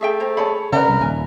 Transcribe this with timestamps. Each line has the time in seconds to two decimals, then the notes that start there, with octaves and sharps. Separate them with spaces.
0.01 A3 G#4 E5 G5
0.20 C5 A#5
0.37 G#4 C#5 A5 B5
0.72 C#3 C#4 A#4 B4 D5 E5 F#5
0.88 C2
1.01 D#1 G#5